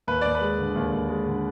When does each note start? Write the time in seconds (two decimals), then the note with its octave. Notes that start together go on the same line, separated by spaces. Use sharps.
0.07 D#2 B4
0.21 D#2 D5
0.35 B4
0.41 G#3
0.59 D3
0.75 D#2
0.92 D#2
1.09 G#3
1.26 D3